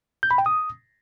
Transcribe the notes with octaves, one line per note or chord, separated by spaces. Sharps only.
G6
B5
G5
D#6